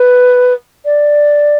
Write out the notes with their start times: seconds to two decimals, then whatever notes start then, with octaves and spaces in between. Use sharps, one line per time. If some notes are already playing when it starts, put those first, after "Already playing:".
Already playing: B4
0.85 D5